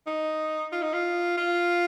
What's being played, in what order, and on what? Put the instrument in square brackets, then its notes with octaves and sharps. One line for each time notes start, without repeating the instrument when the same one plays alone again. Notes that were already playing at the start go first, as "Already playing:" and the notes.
[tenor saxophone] D#4
F4
D#4
F4
F4